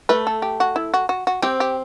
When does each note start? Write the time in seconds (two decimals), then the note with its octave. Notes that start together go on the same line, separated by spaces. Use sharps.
0.09 A3 B4
0.27 A4
0.42 G4
0.60 F#4
0.76 E4
0.94 F#4
1.09 F#4
1.27 F#4
1.42 C4 G4
1.60 G4